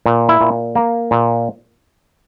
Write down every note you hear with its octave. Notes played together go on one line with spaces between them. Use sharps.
A#2
E4
A#2
A#3
A#2